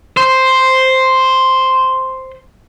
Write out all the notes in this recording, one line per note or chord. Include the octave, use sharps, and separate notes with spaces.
C5